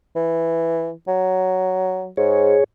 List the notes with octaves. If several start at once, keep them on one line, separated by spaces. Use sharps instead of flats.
E3
F#3
G#2 G#4 C#5